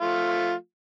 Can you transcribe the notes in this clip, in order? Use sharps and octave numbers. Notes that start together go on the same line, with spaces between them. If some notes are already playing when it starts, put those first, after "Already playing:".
F3 A3 F4